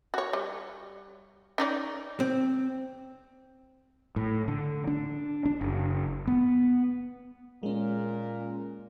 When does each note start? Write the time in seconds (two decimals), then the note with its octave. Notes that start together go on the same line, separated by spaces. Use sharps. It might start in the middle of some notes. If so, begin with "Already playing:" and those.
0.14 F#4 C#5
0.33 G3
1.58 C#4 D#4 D5
2.20 C4
4.16 A2
4.48 D3
4.87 D4
5.46 D4
5.61 F#1
6.27 B3
7.63 A#2 G#3 C#4 A#4